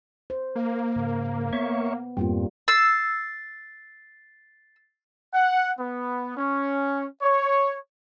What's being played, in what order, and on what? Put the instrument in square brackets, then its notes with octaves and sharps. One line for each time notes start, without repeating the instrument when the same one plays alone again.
[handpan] C5
[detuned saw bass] A#3
[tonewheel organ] G#2 C#3
[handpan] B3 [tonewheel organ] C#5 E5 C#6
[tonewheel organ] F2 G#2 C4 [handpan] G3 A#3 F4
[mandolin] E6 [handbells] A6 C7
[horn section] F#5
B3
C#4
C#5